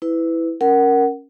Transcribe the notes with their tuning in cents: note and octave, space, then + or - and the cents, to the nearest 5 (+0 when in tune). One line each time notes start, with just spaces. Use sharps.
E4 -5 B4 +20
C#4 +0 A#4 +0 F#5 +20